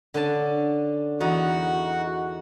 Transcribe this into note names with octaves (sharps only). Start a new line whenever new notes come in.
D3 C#4 A5
E2 D#4 F#4 F#5